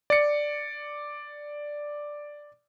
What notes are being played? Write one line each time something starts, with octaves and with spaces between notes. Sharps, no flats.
D5 C#7